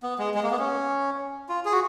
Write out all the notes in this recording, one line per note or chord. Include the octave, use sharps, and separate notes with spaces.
B3
G#3
G#3
A#3
B3
C#4
F4
G#4
F#4